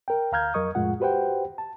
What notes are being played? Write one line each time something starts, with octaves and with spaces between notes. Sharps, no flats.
A#4 G5
D2 F5 A#5 F6 G6 G#6
F2 F#3 A#4 D#5 C#6 D#6
F2 A2 G#3 F4 F#5
F#4 G4 B4 C5 F#5 G5
A5